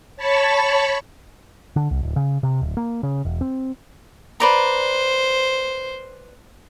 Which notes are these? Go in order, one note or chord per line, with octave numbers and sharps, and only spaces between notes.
C#5 A5 B5 C#6
D3
C2
D1
C#3
C3
D1
A#3
C#3
E1
C4
B4 C5 D5 A#5